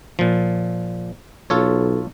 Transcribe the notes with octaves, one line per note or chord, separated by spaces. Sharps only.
A#2 F3
B1 F4 A4 C#5